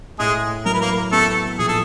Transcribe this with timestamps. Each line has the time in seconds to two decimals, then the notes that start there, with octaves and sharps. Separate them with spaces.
0.19 A2 G#3 G#4
0.65 F#3 A#4
0.74 B4
0.81 A#3 A#4
1.12 A3 B3 A4
1.58 A#1 G#4
1.68 A4